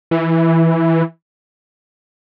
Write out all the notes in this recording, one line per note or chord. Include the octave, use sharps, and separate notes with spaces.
E3